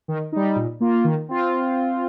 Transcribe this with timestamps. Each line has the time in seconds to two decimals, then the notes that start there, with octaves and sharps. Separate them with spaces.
0.08 D#3
0.32 G3 D#4
0.56 A#2
0.80 A#3 F4
1.04 D#3
1.28 C4 F4